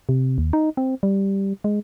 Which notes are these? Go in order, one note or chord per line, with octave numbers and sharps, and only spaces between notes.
C3
D#2
D#4
C4
G3
G#3